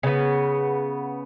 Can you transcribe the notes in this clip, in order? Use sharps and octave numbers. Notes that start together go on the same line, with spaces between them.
C#3 B3